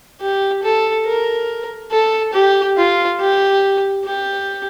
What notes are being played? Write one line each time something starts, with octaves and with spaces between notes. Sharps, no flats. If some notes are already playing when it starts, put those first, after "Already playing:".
G4
A4
A#4
A4
G4
F4
G4
G4